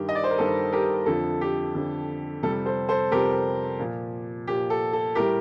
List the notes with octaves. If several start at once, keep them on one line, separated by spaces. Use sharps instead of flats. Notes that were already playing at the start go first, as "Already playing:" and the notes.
Already playing: G2 D#3 G3 G4
D#5
D5
C5
A#4
G2 D#3 G3 A4
G4 A#4
F2 D3 F3 A4
G4
F2 D3 F3
F2 C3 G3 A4
A4 C5
A4 C5
F2 C3 G3 G4 A#4
A#2 F3
A#2 F3 G4
A4
A4
A2 G3 G4 A#4